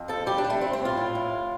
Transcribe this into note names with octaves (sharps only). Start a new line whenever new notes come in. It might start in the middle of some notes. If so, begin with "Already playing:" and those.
Already playing: F2
F3 A4
G3 G4
D4
G3
A3
G3 C4
C4
A2
F4
A2
A2